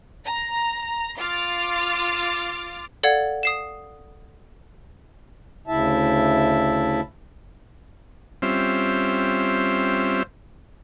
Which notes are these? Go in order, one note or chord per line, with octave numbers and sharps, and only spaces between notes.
A#5
F4 D6 F6 A6
A4 D5 F5 F#5 G#6 A6
D#6 C7 E7
D2 C#3 E4 E5 A5
G3 C4 C#4 F4 C5 E5